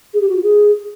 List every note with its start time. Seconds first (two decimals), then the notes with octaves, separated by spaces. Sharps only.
0.13 G#4
0.21 G4
0.28 F#4
0.35 F4
0.43 G#4